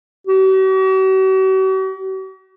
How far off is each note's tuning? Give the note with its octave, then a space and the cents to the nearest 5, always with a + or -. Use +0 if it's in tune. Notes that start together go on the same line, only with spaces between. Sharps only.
F#4 +45